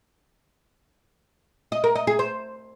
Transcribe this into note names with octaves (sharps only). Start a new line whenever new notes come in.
D#5
A#4
D#5
G#4
C5